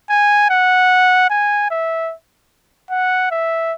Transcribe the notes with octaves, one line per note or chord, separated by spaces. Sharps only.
G#5
F#5
G#5
E5
F#5
E5